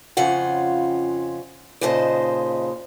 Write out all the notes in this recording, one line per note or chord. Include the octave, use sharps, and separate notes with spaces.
F2 C#3 C#4 F4 F#5
D#2 A#2 C#3 C5 D#5 A5